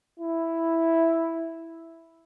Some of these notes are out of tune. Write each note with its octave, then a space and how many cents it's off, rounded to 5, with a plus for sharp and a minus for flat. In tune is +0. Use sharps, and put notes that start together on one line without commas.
E4 +0